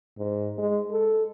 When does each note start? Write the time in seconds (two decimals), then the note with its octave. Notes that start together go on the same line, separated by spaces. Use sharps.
0.18 G#2
0.58 G#3
0.91 A4